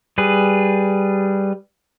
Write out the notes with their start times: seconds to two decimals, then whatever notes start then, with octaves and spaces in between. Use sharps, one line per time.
0.18 G3 G#4 B4